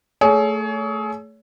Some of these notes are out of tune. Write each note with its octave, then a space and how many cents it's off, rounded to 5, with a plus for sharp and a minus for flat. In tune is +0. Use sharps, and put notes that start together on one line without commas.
A3 +10 G#4 +30 C#5 +30